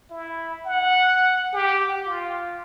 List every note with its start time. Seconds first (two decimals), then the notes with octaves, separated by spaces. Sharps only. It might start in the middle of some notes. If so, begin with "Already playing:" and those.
0.10 E4
0.65 F#5
1.53 G4
2.06 F4